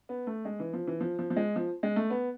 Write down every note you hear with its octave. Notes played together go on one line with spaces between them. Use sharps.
B3
A3
G#3
E3
F3
E3
F3
F3
F3
G#3
F3
G#3
A3
B3